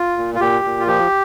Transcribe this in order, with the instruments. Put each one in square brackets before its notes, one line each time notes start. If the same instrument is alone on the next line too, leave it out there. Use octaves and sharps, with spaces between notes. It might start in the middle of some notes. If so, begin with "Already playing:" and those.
Already playing: [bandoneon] F4
A#2
F4
A#2 G4
A#2
F4
F3 G4